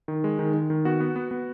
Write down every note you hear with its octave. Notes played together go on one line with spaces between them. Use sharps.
D#3
G#3
D#3
D#3
D#3
B3 F#4
B3
B3
B3